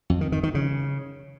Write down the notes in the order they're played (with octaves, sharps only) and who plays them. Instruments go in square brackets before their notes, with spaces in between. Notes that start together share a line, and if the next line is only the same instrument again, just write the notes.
[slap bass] F2
D#3
D#3
D#3
C#3